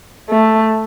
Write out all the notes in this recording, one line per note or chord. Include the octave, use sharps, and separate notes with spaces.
A3